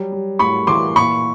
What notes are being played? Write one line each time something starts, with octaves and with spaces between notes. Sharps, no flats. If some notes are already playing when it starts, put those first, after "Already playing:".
Already playing: F#3 G3
G3
A2 B5 C#6
E3 C6 D6
A#2 B5 C#6